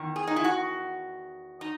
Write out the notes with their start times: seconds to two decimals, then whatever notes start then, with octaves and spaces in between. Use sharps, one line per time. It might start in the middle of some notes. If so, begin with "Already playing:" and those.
Already playing: E2 D#3
0.16 G#4
0.27 D#4
0.36 E4
0.44 F#4
1.61 D#4